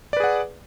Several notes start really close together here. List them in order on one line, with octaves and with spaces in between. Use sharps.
D5 B4 G#4 F#5